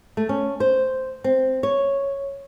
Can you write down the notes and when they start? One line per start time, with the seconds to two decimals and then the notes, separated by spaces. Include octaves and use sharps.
0.17 A3
0.29 C#4
0.60 C5
1.24 C4
1.63 C#5